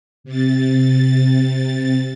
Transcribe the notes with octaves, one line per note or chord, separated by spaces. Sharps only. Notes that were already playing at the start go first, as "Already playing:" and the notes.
C3 A6